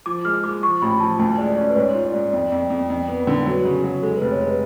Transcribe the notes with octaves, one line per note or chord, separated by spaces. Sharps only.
F3 D6
G#3 F6
G#3 D6
F3 C#6
A1 B5
F3 A5
D2 A5
G#3 D5
C#4 D5
B4
G#2 C#5
F4
D5
G#2
F2 D5
F2
F2
F2
B3
D3
F#3 B4
C#3
G#4
F#3
G#3 A4
F1 B4
C#5
G#3 B4